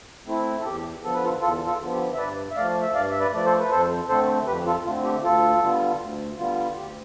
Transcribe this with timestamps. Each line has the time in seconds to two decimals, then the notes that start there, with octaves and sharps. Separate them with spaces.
0.26 A3 C4 E4
0.60 A4
0.65 E2 G4
1.03 D3 F3 B3 A4
1.14 B4
1.24 F4 A4
1.41 E2 F4 A4
1.66 F4 A4
1.79 D3 F3 B3
1.92 G4
2.14 E5
2.17 G2 B4 D5
2.51 E5
2.56 F3 A3 D5 F5
2.82 E5
2.94 G2 D5 F5
3.12 E5
3.20 B4 D5
3.32 F3 A3 D5
3.45 A4 C5
3.59 B4
3.70 F2 A4 C5
4.08 D3 A3 C4 A4 C5
4.46 F2 G4 B4
4.66 F4 A4
4.85 D3 A3 C4 F4
5.04 G4
5.23 D2 F4 A4
5.61 D3 G3 B3 F4
6.00 D2
6.38 D3 G3 B3 F4
6.76 D2 G4